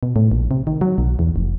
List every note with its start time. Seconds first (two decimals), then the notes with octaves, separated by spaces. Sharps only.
0.03 B2
0.16 A2
0.32 A#1
0.51 C3
0.67 D#3
0.81 F#3
0.98 B1
1.19 E2
1.36 F1